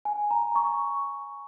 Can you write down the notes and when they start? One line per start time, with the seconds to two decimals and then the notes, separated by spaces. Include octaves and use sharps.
0.05 G#5
0.31 A#5
0.56 C#6